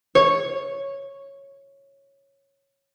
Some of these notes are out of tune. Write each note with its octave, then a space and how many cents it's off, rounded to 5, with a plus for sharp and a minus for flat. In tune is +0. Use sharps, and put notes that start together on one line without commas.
C#5 -5